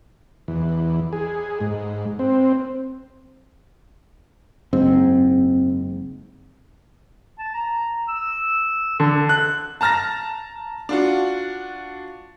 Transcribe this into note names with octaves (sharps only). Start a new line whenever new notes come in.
E2
G#4
G#2
C4
F#1 G#2 C4
A5
A#5
E6
D3 A4
F#6
A5 A#5 F6 A6 A#6
D4 F4 F#4